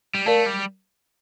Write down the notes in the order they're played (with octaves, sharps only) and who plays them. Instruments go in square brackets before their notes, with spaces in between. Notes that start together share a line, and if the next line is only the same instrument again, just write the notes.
[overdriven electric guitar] G3
[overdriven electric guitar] A3 [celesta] A#4 D5 F5 A5
[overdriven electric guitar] G3